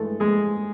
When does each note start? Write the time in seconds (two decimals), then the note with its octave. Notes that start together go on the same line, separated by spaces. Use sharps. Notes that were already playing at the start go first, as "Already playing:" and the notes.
Already playing: G2 E3 G#3 A3 A4
0.20 G#3 G#4